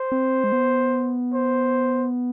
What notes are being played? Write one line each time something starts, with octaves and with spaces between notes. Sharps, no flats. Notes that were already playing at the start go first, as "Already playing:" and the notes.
Already playing: C5
C4
G#3
B3
C5